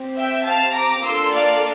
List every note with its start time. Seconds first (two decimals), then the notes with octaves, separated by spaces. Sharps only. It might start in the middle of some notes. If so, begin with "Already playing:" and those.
Already playing: C4 G4
0.18 E5 G5
0.47 F5 A5
0.76 A#5 D6
1.05 A#3 D4 F4 A4 C6 E6
1.34 D5 F5